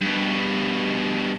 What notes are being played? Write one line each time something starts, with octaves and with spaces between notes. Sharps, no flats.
G2 B2